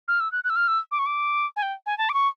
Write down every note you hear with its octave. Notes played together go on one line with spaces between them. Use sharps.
F6
E6
F#6
F#6
E6
F6
E6
D6
C#6
D6
G#5
G5
G#5
A5
D6
C#6